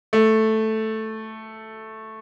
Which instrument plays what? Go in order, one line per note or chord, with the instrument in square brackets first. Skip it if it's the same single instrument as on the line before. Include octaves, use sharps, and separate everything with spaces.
[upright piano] A3